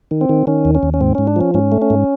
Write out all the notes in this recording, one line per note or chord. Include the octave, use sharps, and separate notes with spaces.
D#3
C4
D#3
D#3 C#4
D#2
C#4
D#2
C#4
G#2 C4
G#2 C#4
D4
F3 C#4
G#2 C#4
A3
C#4
G#2